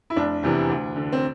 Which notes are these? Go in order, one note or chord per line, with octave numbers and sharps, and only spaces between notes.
E4
F1 D4
E2 C3 E3
D2
D3
C4